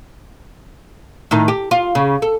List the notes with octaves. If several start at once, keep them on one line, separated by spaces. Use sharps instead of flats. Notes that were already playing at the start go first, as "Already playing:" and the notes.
A2 D#3 D#4
G4
F4
C#3
A4